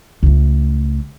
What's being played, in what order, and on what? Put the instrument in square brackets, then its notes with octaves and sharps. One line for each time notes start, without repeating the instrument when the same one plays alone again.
[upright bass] C#2 A3